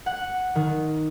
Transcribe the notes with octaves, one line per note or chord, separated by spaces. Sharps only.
F#5
D#3